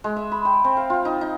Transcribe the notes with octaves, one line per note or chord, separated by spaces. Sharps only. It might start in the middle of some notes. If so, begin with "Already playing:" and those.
G#3
E5
B5
G5
C4
F5
F4
D#4
D#4